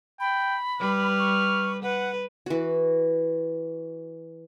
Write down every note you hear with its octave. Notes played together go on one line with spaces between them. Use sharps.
G5 B5
G3 B4 F6
C#6
B4 F#5
E3 F#4